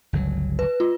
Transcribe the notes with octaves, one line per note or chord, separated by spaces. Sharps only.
G1 C#2 F#3
B4
F4